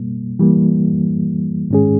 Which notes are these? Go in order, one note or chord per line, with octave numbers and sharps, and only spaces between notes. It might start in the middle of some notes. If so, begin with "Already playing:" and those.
Already playing: B2 G3 A#3
E3 G3 A#3
G#2 D#3 G#3 C#4 G#4